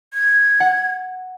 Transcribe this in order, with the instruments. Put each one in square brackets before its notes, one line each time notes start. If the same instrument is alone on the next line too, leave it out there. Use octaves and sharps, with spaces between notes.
[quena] G#6
[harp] F#5